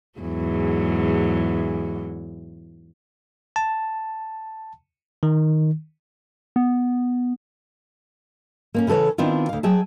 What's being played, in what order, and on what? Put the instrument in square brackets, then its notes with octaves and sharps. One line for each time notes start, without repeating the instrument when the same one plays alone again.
[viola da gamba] E2 G#2 F#3
[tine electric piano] A5
D#3
[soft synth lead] B3
[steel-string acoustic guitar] A#3 C4 C#4
C#3 E3 A4 B4 C#5
D#3 B3 C4 D4 E4 F4
D2 F5
F#3 G#4 E5 G5 A5